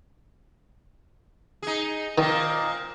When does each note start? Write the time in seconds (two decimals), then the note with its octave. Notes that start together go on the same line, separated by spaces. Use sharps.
1.62 D#4 G#4
2.18 A#2 D#3 C4 D#4 A#4 D#5